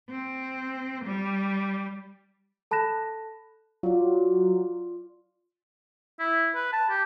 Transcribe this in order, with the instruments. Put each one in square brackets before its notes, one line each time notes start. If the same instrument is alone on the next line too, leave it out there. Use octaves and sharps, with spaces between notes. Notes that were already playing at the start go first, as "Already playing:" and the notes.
[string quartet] C4
G3
[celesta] A4 A5 B5 F#6 A#6 E7
[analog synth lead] F#3 [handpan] F4 D5
[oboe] E4
B4
A5
G4